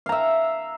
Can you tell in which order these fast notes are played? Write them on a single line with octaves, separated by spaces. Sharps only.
F5 A#5 E5